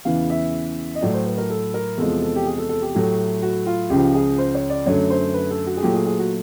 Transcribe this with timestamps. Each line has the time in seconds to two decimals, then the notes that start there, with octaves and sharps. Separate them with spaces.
0.05 E2 C#3 E3 F5
0.30 E5
0.95 D#5
1.01 A2 F#3 A3 D5
1.14 C5
1.26 B4
1.38 A#4
1.50 A4
1.74 A#4
1.98 E2 C3 F3 G#3 A4
2.22 A4
2.35 G4
2.46 G#4
2.58 A4
2.69 A4
2.82 G4
2.95 A2 F#3 A3
3.42 F#4
3.66 F4
3.90 C#2 C#3 F3 G4
4.14 G#4
4.38 C5
4.55 C#5
4.70 D5
4.86 F#2 D3 F#3 A3 C#5
5.10 C5
5.34 B4
5.51 A4
5.66 F#4
5.77 G#4
5.82 A#2 F#3 A3 G4
5.94 G#4
6.06 G#4
6.19 F#4